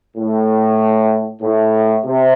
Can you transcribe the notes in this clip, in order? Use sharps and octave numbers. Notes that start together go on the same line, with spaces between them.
A2
A2
C3